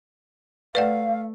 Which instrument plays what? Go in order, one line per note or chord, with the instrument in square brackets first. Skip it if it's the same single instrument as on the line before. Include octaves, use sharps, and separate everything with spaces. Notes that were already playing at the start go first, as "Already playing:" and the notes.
[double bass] A3 [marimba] B4 D5 F#5 [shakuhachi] F5